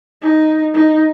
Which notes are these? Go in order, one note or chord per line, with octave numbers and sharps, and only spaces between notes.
D#4
D#4